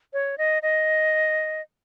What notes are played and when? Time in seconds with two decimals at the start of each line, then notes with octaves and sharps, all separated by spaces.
0.13 C#5
0.38 D#5
0.63 D#5